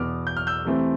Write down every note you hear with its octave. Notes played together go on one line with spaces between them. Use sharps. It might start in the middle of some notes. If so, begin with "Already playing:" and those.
Already playing: E2 B2 B3 D6 F6
G6
F6
E6 G6
C3 E3 A3 C4